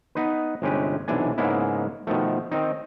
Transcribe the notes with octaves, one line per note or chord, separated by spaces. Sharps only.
B3 D#4 B4
G1 C3 G#3 C#4 G4 B4
B1 C3 E3 D4 G#5
G#2 C#3 G#3 A#3 B3 E4
B2 D#3 F3 A3
D#3 C4 D#4